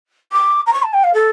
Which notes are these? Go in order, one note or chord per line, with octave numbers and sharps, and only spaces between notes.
D6
A#5
C#6
A5
G5
F5
A4